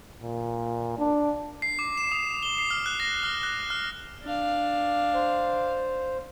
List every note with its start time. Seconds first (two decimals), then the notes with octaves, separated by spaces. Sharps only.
0.22 A#2
0.99 D4
1.62 C7
1.79 D6
1.97 E7
2.12 D#6
2.43 G7
2.58 C7
2.71 F6
2.86 F#6
3.00 A#6
3.23 F6
3.43 F#6
3.70 F6
4.23 D4 F5
5.14 C5